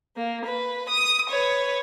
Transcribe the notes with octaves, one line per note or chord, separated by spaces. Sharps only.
A#3
B4
D#6
B4 C#5